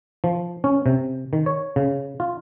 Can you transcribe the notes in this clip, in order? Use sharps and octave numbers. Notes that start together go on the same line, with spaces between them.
F3
C#4
C3
D#3
C#5
C#3
F4